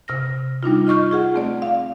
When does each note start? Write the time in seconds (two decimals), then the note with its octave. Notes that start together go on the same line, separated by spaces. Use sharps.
0.08 C3 F6 A#6
0.63 G3 D4 D#4 F4
0.87 F4 D#5 C#6 F6 G6
1.11 F4 G#4 F#5
1.34 A3 C4 D5
1.62 F5